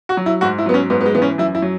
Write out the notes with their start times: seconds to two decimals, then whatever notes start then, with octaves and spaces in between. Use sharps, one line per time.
0.09 F#4
0.17 F#3
0.26 E4
0.41 G#2 F#4
0.58 E4
0.66 F#3 B3
0.74 C#4
0.90 G#2 B3
1.01 B3
1.06 G#3
1.15 E3 B3
1.22 C#4
1.38 F#2 E4
1.55 E4
1.62 F#3